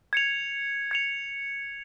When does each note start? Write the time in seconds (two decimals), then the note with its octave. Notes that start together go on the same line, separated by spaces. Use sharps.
0.13 G#6 C#7 F7
0.91 G#6 C#7 F7